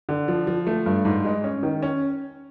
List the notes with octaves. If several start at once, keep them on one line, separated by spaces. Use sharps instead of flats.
D3
F3
F3
A3
G2
G#2
G#3
C#4
D#3
C#4